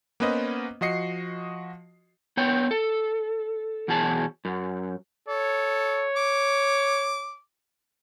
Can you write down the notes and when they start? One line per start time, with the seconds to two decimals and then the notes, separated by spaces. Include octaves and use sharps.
0.20 A#3 B3 C#4 B4 C5 D#5
0.81 F3 F#4 D#5 C7 C#7
2.37 B3 C#5 G5
2.71 A4
3.88 E2 B2 F#3 G#4 A5
4.45 F#2
5.28 A4 C#5
6.16 D6